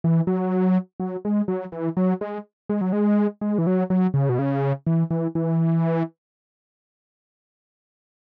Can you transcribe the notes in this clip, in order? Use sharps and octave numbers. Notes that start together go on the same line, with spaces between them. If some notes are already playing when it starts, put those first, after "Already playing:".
E3
F#3
F#3
G#3
F#3
E3
F#3
G#3
G#3
F#3
G#3
G#3
E3
F#3
F#3
C#3
B2
C#3
E3
E3
E3